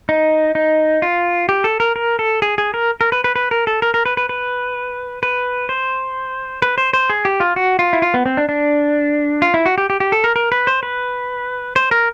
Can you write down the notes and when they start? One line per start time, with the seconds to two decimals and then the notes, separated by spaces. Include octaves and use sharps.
0.09 D#4
0.55 D#4
1.02 F4
1.49 G4
1.64 A4
1.80 A#4
1.96 A#4
2.19 A4
2.42 G#4
2.58 G#4
2.74 A#4
3.01 A#4
3.12 B4
3.24 B4
3.36 B4
3.51 A#4
3.67 A4
3.82 A#4
3.94 A#4
4.06 B4
4.17 B4
4.29 B4
5.23 B4
5.69 C5
6.62 B4
6.78 C5
6.93 C5
7.10 G#4
7.25 G4
7.40 F4
7.56 F#4
7.79 F4
7.93 E4
8.02 F4
8.14 B3
8.26 C4
8.37 D4
8.49 D4
9.42 F4
9.54 E4
9.66 F#4
9.78 G4
9.90 G4
10.00 G4
10.12 A4
10.24 A#4
10.36 A#4
10.52 B4
10.67 C5
10.83 B4
11.76 C5
11.91 A#4